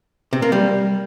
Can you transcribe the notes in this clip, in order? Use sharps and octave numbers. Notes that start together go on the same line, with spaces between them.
C3
A#3
G3